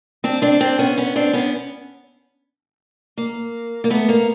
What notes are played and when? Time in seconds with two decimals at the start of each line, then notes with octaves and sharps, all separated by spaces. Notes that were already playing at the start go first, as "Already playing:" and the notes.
0.24 C4 D4
0.42 C4 D4
0.60 C4 D4
0.79 B3 C#4
0.97 B3 C#4
1.16 C4 D4
1.33 B3 C#4
3.17 A#3
3.84 A#3
3.90 A3 B3
4.09 A#3